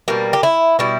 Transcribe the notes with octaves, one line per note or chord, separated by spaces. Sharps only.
B2 G3 A#3
G4
E4
B2 G3 E4